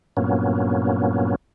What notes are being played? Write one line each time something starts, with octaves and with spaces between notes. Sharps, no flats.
G2 A#2 F#3 A#3 B3 C#4